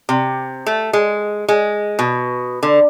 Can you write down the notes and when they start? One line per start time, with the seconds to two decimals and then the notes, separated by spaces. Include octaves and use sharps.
0.09 C3
0.67 A3
0.93 G#3
1.48 G#3
1.99 B2
2.63 D3